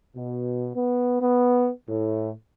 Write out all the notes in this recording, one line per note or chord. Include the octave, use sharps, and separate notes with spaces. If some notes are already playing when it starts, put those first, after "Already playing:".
B2
B3
B3
A2